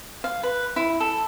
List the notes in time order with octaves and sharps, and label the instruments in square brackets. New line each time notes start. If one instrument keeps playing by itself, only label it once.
[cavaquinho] F5
B4
E4
A4